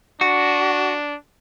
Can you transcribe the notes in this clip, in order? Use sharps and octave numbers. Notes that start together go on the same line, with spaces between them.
D4 F#4